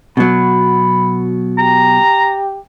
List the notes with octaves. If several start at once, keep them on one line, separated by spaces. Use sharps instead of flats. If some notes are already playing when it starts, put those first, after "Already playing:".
B2 F#3 B5
G4 A#5